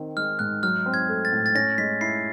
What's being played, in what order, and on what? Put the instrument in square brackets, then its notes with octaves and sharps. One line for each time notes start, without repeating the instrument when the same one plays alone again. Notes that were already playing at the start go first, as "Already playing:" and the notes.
Already playing: [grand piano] D#3 C4
[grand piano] G#3 [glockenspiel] F6
[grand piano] G#2 [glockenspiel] F#6
[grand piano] F#3 [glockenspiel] F6
[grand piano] C4
[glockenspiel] G#6
[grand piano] A3
[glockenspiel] A6
[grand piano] A2
[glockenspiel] A6
[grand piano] C#4 [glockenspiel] A#6
[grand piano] G#3 [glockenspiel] B6
[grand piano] E4 [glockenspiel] C7